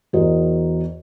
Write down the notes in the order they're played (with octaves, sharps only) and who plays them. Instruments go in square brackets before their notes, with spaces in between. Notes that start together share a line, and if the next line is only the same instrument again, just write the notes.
[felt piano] E2 F#4 A#4 C5 D#5